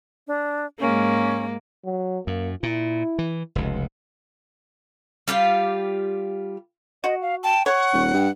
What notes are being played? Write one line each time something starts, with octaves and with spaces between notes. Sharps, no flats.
D4
G#2 G#3 A#3 C#4
F#3
F#2 A#3
A#2 E4
E3
F1 C#2
G3 F4 G4 F5
F#4 D#5
F5
G5 A5
C#5 F#5 C#6
D#1
G2 G5